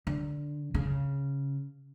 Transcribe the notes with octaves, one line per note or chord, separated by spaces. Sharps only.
D3
C#3